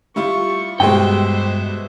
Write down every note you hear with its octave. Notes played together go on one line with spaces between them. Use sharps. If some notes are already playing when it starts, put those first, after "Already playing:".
G3 E4 F4 C#6
G2 B2 G3 G#3 C5 E5 G5